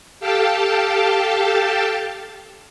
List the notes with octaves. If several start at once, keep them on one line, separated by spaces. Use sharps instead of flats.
G4 A4 F5 G5 A5